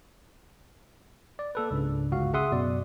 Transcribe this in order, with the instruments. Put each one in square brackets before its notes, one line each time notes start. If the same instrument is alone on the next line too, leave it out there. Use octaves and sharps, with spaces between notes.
[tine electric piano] D5
A#3 A4 B4
C#2 G#2 C#3 D4
G1 C#2 F#4 F5
C#3 G#4 E5 F#5 C6 D#6
F#2 B2 D5